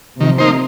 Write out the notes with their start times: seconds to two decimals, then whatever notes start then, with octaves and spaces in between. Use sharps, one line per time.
0.20 C3 D#3 F3
0.38 A#3 D#4 C5